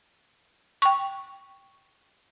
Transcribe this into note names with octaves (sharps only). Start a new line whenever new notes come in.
G5 C#6